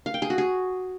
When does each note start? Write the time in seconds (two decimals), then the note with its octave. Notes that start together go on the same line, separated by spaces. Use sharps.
0.06 F5
0.14 G5
0.22 G#4
0.30 F#4
0.38 G#4